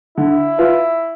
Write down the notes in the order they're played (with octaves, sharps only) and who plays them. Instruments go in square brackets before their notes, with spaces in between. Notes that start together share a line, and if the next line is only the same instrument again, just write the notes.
[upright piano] D3 [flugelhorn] E4
[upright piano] F4 B4